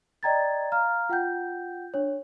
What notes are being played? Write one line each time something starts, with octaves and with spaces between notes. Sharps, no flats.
D5 D#5 G5 A#5 G#6 A6
F5 A#5 F6
F4 F#5 G5 G6
D4 C#5